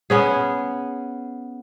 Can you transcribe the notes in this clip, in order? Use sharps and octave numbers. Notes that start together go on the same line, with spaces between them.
B3 C#4 G#4